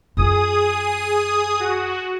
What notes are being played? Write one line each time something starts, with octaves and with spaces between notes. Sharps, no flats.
F#2 F4 G#4 D#6
F#4